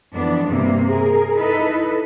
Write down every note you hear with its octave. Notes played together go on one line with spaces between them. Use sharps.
F2 E3 B3 D4
G2 C3 G3 A#3
G#4 A#4
D#4 E4 A4 B4 D#5